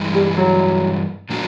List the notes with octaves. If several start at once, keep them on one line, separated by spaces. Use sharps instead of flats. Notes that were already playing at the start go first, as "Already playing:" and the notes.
Already playing: G2 E3 G#3
G3
F#3
A2 F3 A#3 D4 F#4